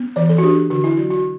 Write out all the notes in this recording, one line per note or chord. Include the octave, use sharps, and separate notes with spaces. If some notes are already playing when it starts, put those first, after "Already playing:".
Already playing: B3
E3 D5
A4
F#4
D4 G4
D3 F#4
E4
F#3 F#4
F#4